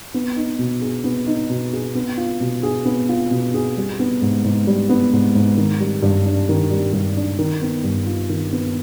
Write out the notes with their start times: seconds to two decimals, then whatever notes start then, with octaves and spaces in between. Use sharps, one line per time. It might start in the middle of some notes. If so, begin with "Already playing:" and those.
0.14 B3
0.36 D#4
0.59 B2
0.82 G#4
1.04 B3
1.27 D#4
1.50 B2
1.73 G#4
1.95 B3
2.17 F4
2.41 B2
2.63 G#4
2.85 B3
3.09 F4
3.31 B2
3.54 G#4
3.77 G3
3.99 B3
4.22 G#2
4.44 G#2
4.67 G3
4.89 B3
5.13 G#2
5.35 G#2
5.57 D#3
5.80 G3
6.02 G2
6.26 D4
6.49 D#3
6.70 G3
6.93 G2
7.17 D4
7.39 D#3
7.61 B3
7.84 G2
8.06 F4
8.29 D#3
8.53 B3